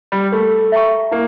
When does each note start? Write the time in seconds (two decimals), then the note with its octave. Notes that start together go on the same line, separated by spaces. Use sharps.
0.12 G3
0.32 A3 A#4
0.72 E5 G5 A#5 C#6
1.11 A#3 E4